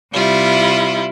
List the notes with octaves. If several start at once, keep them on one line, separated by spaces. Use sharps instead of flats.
C3 G3 E4 F4